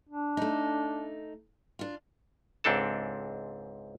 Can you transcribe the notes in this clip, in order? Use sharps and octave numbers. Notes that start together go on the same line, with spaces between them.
D4
A3 D#4
D4 F4
C#2 G#2 C4 D4 A4 A5